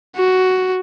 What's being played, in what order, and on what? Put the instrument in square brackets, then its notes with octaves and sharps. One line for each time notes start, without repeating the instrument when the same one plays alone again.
[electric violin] F#4